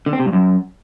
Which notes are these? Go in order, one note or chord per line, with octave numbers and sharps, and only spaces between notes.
D3
C4
C3
G2
F#2